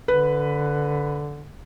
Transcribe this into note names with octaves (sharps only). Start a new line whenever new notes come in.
D3 B4